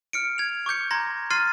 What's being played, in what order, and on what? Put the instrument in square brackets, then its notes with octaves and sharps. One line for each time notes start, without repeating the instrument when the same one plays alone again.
[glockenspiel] F6 C#7 D7
G#6 F7
C#6 D6 G6 C#7
A#5 C6 G#6 A#6
C6 F6 A6 C7 D#7